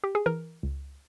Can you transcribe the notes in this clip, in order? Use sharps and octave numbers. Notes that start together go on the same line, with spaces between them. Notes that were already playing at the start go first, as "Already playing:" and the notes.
G4
G#4
E3 A#4
C#2